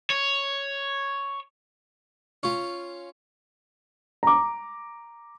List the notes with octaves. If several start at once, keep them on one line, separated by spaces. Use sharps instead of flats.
C#5
C#4 F4
A#5 D6